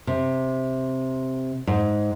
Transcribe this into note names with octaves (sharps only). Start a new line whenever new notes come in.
C3
G#2